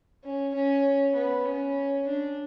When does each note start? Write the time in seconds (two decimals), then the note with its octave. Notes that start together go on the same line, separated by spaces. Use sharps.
0.24 C#4
0.54 C#4
1.16 B3
1.46 C#4
2.07 D4